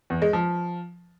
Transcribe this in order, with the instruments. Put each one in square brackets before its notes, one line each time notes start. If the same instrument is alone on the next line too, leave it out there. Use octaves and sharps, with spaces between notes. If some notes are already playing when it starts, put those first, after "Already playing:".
[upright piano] E2
G#3
F3